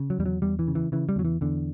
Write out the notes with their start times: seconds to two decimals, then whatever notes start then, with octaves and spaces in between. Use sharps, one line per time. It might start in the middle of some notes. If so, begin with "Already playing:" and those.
Already playing: C#3
0.10 F#3
0.18 E2 G3
0.26 F#3
0.42 E2 G3
0.59 E3
0.68 C#3
0.75 E3
0.92 C#3 E3
1.09 G3
1.16 E2 F#3
1.25 E3
1.41 E2 D3